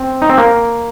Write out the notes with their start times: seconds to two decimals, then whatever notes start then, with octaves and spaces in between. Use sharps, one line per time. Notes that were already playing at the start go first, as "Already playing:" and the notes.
Already playing: C4
0.22 D#4
0.29 C4
0.38 A#3